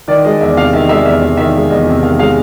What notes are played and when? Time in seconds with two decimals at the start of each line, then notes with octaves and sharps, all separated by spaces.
0.08 D#3 D5
0.24 G#3 D#5
0.41 E2 E5
0.57 C3 F5
0.73 D#3 E5
0.89 G#3 E5
1.06 E2 E5
1.21 C3 E5
1.37 D#3 E5
1.54 G#3
1.70 E2 D#5
1.86 C3
2.02 D#3 F5
2.19 G#3 F5